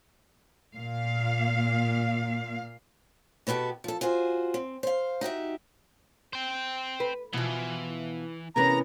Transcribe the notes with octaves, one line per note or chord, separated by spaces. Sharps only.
A#2 F5
B2 B3 F#4 G4 A4
F3 A4
F4 F#4 G#4 C5
C4
C5 F5
D#4 F#4 G4 E5
C5 G5
B4
B2 E3 F3
C3 E3 B3 C#4 G#4 A#4 A#5